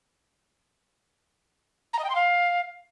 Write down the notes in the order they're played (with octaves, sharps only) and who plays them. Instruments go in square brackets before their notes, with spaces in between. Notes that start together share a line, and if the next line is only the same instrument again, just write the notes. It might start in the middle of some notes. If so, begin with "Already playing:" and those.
[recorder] A#5
D#5
G5
C6
F5